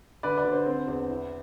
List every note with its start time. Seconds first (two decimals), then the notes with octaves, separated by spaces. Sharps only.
0.23 D3 B4 D5
0.37 B4 D5
0.45 D3
0.52 C5
0.66 C4
0.88 E2
1.10 E4